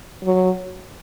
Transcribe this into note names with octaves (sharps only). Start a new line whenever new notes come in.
F#3